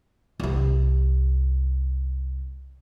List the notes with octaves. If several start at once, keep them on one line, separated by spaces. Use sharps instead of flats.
C2 C4